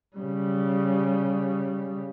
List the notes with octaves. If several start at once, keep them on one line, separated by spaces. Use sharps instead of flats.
C#3 G3